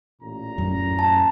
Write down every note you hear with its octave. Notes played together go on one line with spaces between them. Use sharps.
A1 A#2 A#5
F#2
A5